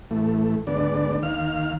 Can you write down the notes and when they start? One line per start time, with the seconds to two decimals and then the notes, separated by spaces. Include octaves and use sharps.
0.11 A2 E3 A3
0.67 D2 G#2 B3 D4 D5
1.23 D#2 D#3 F5 F6